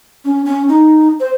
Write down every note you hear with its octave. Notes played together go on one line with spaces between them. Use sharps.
C#4
C#4
D#4
C5